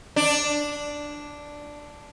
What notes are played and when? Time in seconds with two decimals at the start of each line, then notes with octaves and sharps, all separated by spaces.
0.16 D4